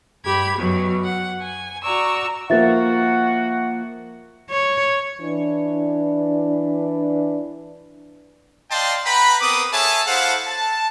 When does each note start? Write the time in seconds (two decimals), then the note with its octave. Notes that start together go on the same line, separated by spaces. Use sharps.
0.24 G2 G4 B5 G#6
0.56 F#2 B2 F#3
1.02 F#5
1.41 G#5
1.82 F#4 D5 A#5 C#6 E6
2.50 F3 A#3 F#4 E5 F#5 A6
4.50 C#5
5.21 E3 D4
8.71 D5 D#5 F5 G5 A5 C6
9.04 B4 F#5 G5 A#5 B5
9.41 B3 C4 A#4 B4 D6 D#6
9.73 G#4 A4 C#5 E5 G#5 A5
10.07 E4 A4 C5 F5 F#5 A5
10.47 A5